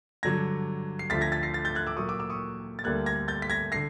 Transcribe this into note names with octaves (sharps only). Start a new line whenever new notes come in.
G2 D3 F#3 G#6 A#6
C7
D2 D3 F3 A6 B6
G#6 A#6
A6 B6
A#6 C7
A6 B6
G6 A6
F#6 G#6
D6 E6
A#2 F#3 A#3 C#6 D#6
D6 E6
D6 E6
C#6 D#6
A6
D2 D3 G3 A#3 F#6 G#6
G#6 A#6
G6 A6
B6
G#6 A#6
D3 A#6 C7